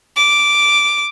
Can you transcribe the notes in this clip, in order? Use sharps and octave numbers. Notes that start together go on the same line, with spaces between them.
D6